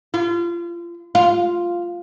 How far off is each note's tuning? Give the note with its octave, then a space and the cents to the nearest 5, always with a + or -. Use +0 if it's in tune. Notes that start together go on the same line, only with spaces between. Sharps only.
F4 -30
F4 +0